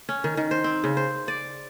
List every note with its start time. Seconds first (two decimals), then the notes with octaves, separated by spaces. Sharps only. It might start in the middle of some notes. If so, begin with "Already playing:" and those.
0.09 C#4
0.24 D#3
0.37 D#3
0.51 C5
0.64 C4
0.84 C#3
0.97 C5
1.28 D5